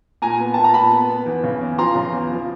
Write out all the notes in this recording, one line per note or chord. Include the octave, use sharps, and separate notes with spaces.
A#2 G#5 A#5
B3
A#2 A5
A#5
A#2 A5 B5
B3
B3
E2
C#3
E2
F3 A#5 C6
C#3
E2
F3